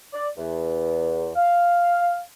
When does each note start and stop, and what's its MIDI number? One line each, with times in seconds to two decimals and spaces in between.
0.14 0.29 74
0.38 1.30 40
1.36 2.21 77